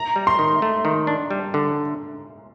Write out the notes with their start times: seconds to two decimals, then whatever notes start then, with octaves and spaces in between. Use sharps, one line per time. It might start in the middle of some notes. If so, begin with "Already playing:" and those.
Already playing: A#5
0.16 G3
0.27 C6
0.39 D#3
0.62 A3
0.85 D#3
1.07 D4
1.30 G3
1.54 D3